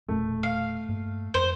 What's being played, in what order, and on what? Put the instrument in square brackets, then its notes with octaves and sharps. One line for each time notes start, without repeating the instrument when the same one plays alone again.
[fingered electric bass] E1 A#2 [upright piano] A3
[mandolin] F5
[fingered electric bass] G2 A#3
[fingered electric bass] F2 [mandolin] C5